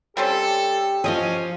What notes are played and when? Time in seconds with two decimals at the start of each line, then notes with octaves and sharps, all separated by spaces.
0.17 G3 C4 C#4 G4 A4
1.04 F3 C#4 F4 G#4 D#5